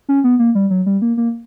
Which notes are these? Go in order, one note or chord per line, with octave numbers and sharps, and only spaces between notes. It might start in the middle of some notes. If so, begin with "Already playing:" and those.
C#4
B3
A#3
G3
F#3
G3
A#3
A#3